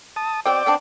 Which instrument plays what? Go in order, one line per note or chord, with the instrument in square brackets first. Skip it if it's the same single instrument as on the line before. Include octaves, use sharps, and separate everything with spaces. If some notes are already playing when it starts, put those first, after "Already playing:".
[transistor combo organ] A5 D#6
[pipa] B2 C4 [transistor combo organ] D5 G5 D6
[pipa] B3 C4 D4